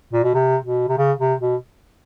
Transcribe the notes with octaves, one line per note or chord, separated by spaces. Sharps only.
A#2
B2
C3
B2
C3
C#3
C3
B2